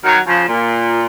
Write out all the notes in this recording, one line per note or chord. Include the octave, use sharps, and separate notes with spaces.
D#3 F#3
C#3 F3
A#2